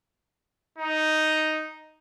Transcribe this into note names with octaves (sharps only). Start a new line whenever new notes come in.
D#4